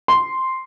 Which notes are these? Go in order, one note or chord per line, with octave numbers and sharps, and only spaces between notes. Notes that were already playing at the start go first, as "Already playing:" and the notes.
C6